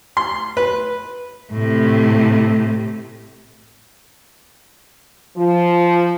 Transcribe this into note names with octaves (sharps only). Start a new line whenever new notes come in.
C6
B4
A2 C3
F3